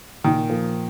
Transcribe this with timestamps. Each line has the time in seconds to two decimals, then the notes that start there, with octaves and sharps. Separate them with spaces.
0.24 A#2 D#3
0.50 F3 A#3